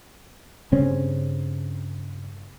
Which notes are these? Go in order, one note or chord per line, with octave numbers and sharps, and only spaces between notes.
G2 C#3 C4 C#4